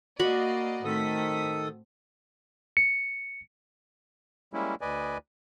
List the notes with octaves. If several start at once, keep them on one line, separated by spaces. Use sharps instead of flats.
A#3 F#4 D5 D#5 B5
A2 D#3 C4 A4 D#6 B6
C#7
G3 G#3 A#3 C#4 E4
D2 B4 D5 D#5 G#5